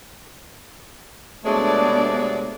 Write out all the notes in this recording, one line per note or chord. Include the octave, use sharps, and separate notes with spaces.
C3 F#3 G#3 A3 B3 D4 D5